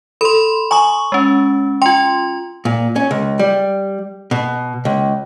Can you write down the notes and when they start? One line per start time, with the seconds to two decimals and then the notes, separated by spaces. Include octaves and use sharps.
0.21 A4 B5 C6
0.71 G#5 A#5 C#6 D#6
1.12 G#3 C#4
1.82 F4 G5 C6
2.65 A#2
2.96 C#4
3.11 C#2
3.39 G3
4.31 B2
4.85 C#2